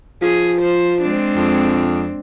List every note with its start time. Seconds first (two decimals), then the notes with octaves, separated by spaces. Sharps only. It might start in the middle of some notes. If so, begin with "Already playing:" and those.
0.22 F3 G#4
0.61 C5
1.02 G#3 C4 D4
1.37 F2